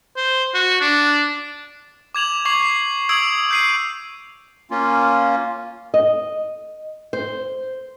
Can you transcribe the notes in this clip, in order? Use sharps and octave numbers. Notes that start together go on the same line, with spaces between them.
C5
F#4
D4
D6 G#6 F7 F#7
C#6 D6 G#6 C7 F#7
C7
D#6 E6 G#6 D7 F#7
G6 C7 D#7
A#3 C#4 F4
D#5
C5